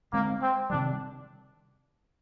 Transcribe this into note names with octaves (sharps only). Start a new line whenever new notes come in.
D3 G#3 A#3 C4
C4
C3 D#3 G3 D4